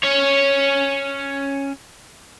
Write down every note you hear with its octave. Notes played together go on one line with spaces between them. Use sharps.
C#4 C#5